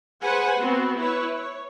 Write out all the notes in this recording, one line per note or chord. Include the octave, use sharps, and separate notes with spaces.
G#4 B4 C5 F#5 G#5
B3 C4 F#4
E4 B4 C#5
C#5